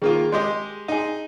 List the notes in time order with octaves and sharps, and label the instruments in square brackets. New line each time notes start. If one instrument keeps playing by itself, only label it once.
[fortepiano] D#3 A#3 F4 [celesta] G#4
[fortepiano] G#3 G4 D#5 [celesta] C6
[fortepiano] D#4 G#4